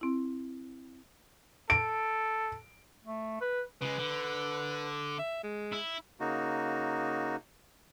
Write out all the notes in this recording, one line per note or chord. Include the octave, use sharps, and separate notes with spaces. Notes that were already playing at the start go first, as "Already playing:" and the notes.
C4 E4
A4 D7
A3
B4
C#3 G#3 B4
D3
E5
G#3
E4
C#3 A#3 D#4 F#4